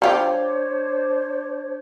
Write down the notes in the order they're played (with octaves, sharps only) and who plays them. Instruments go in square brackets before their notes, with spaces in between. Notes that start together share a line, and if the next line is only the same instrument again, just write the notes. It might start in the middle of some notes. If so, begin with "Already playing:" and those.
[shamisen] G3 F4 G4 [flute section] D4 C5 C#5